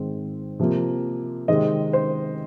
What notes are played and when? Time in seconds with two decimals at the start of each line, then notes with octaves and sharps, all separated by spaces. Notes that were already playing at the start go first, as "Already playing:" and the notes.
Already playing: G#2 D#3 G#3 C4
0.60 C3 F3 A#3
1.48 C3 D#3 G#3 C4 D#5
1.93 C5